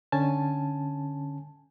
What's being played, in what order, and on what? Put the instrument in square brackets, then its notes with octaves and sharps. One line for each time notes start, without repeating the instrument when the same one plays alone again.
[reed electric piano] D3 C#4 G#5 A5